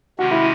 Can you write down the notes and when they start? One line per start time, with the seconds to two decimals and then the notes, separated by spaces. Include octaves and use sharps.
0.19 C3 D#3 G#3 C#4 F#4
0.31 E4